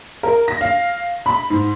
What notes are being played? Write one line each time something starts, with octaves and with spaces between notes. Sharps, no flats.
A#4
A#6
F5
B5
G#2